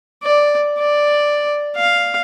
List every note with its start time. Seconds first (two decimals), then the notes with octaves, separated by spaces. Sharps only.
0.23 D5
0.78 D5
1.76 F5